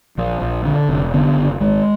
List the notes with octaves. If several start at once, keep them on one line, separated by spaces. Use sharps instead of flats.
A#1 F3
A#1
D3
F1
D3 B3
F#1
G#1 G#3